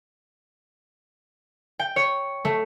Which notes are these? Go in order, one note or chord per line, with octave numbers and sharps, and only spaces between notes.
G5
C#5
A3